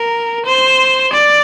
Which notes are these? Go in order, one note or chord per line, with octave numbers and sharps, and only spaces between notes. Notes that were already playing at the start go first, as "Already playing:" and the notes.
Already playing: A#4
C5
D5